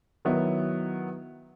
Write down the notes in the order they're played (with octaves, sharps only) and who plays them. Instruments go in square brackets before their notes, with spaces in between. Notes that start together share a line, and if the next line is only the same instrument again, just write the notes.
[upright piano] D#3 F#3 B3 E4